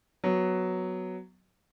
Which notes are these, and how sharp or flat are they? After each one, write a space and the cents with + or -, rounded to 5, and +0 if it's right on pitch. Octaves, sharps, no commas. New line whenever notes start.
F#3 +0 B3 +0